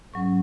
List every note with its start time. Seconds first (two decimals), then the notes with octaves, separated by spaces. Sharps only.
0.14 G#2 F#3 C#4 C#6